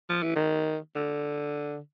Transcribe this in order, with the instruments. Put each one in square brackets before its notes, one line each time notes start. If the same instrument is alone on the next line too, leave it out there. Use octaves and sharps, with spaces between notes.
[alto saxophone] F3
E3
D#3
D3